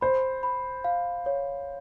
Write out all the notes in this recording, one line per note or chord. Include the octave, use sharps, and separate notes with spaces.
C5 B5
B5
F5
C#5